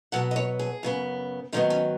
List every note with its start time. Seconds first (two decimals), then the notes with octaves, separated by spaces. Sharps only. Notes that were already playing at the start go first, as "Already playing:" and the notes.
0.12 B2 F#3 B3 F#5
0.31 D#5
0.36 C#5
0.59 G#4
0.83 F#2 C#3 B3
1.52 G#2 D#3 F#3 B3 D#4
1.70 C#4